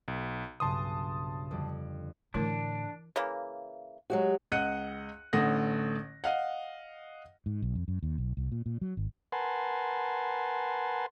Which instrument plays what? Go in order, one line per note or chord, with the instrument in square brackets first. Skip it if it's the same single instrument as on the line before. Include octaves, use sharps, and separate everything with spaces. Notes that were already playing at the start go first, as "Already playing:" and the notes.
[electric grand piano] B1
[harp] B1 G2 C#3 [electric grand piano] A5 C6 D#6
[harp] F2 D3 G3
[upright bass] A2 D3 [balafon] E3 E4 A#4 [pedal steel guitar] D4
[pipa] C#3 E3 A#3
[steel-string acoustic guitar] F#3 G#3 F#4 [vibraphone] G4
[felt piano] C#2 D#5 F#5 F#6 C#7 D#7
A1 A2 D3 F#5 D#6 A#6
D#5 F5 F#5
[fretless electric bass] G#2
B1
F2
F#2
D#2
B1
C2
A#2
A#2
F#3
G#1
[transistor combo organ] A#4 B4 F#5 G#5 A5 C6